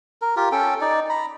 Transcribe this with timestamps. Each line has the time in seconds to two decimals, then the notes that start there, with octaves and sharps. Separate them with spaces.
0.22 A#4
0.36 F4 G4 A#4
0.52 C#4 A4 G5
0.81 D#4 D5
1.09 A#5 B5